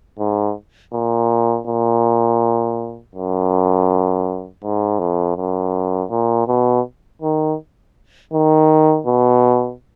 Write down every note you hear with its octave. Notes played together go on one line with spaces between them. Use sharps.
G#2
A#2
A#2
F#2
G#2
F2
F#2
A#2
B2
D#3
D#3
B2